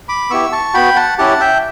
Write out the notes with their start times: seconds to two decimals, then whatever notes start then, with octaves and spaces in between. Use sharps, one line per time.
0.09 B5 D6
0.30 B3 E4 G4 C#6 E6
0.52 A5 C#6
0.74 B3 F#4 G5 B5
0.96 F#5 A5
1.18 C#4 E4 G4 F#5 A5
1.40 E5 G5